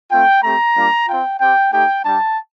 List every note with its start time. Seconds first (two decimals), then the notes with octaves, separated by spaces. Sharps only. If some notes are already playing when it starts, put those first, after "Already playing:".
0.11 A3 C4 F4 G5
0.43 A3 C4 G4 A#5
0.75 G3 A#3 D4 F4
1.08 C4 F4 G5
1.40 C4 G4 G5
1.72 A3 D#4 G4 G5
2.04 G3 D4 G4 A5